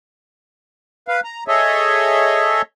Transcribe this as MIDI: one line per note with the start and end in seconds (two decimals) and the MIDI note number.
1.08 1.20 71
1.08 1.20 77
1.24 1.44 82
1.48 2.62 68
1.48 2.62 69
1.48 2.62 73
1.48 2.62 75
1.48 2.62 76